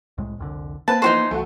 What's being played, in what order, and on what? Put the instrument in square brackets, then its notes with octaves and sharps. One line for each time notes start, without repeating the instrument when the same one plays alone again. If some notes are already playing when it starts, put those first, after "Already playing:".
[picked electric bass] C2 A2 G#3
F1 C2 D3
[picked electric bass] A#3 [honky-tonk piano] C4 B4 [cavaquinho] A5
[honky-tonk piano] E3 F3 B3 [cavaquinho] D#4 F#4 C5
[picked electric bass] C2 E3 [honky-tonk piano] A3 F#4